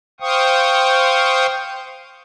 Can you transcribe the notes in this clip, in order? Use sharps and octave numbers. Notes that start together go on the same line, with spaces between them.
C5 F5 G5 C#6 D#6